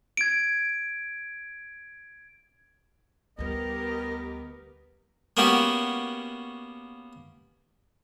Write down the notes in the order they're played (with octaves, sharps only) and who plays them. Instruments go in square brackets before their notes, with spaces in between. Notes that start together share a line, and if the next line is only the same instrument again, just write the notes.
[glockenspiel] G#6 D7
[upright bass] D2 G3 [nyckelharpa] B3 [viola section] G4 A#4 [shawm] D#5
[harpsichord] A#3 B3 C#4 F#4 G4